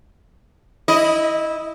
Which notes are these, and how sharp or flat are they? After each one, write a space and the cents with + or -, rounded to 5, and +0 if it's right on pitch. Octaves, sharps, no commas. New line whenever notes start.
E4 -15 D#5 +0